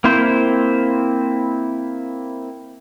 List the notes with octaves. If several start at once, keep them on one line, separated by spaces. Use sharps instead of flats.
A#3 C4 E4 C5